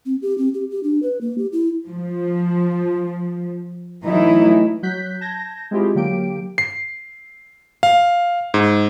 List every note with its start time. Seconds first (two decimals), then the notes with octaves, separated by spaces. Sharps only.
0.06 C4
0.22 G4
0.38 C4
0.54 G4
0.71 G4
0.83 D4
1.03 B4
1.21 A#3
1.38 G4
1.52 E4
1.88 F3
4.04 E3 F#3 A3 D#4 E4
4.83 F#3 F#6 G6 B6
5.21 A5 G6 G#6 A#6
5.71 G#3 C4 E4 F4 G4 G#4
5.95 D3 F#3 A#3 G4 G5 D7
6.58 C7
7.83 F5
8.54 G#2